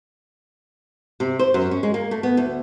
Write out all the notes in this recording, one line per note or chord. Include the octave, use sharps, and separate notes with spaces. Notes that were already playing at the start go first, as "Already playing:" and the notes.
C3
C5
F#2
C#4
G#3
A#3
A3
B3
D2